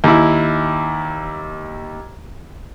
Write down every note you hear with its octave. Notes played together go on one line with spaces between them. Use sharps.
D#2 E4